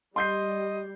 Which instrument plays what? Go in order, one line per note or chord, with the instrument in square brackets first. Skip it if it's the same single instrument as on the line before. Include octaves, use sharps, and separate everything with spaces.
[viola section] G3 [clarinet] D#5 [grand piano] C6 G6 C7